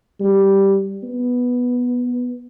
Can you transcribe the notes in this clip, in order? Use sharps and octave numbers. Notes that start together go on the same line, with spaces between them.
G3
B3